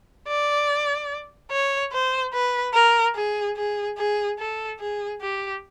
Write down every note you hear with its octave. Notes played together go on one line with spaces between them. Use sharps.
D5
C#5
C5
B4
A#4
G#4
G#4
G#4
A4
G#4
G4